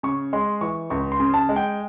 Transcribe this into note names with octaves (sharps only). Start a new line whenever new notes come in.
C#3 C#6
G#3 C6
E3 C#6
C#2 C#6
C6
C#3
A5
G#3
G5